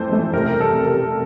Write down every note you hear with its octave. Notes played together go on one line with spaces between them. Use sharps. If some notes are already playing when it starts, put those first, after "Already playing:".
Already playing: F2 E3 A3 C5
A3
C3 A#4
G3
A4
C3
C3